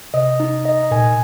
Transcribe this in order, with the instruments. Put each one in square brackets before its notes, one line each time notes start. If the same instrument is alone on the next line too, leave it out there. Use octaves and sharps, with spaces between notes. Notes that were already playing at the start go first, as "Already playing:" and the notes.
[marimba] C3 [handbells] D#5
[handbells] D#4
D#5
[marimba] A#2 [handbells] G#5